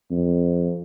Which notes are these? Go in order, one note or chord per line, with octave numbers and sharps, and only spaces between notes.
F2